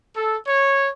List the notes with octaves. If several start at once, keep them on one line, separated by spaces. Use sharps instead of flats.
A4
C#5